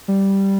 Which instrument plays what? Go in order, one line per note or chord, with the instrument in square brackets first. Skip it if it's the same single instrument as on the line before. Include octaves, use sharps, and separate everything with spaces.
[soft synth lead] G3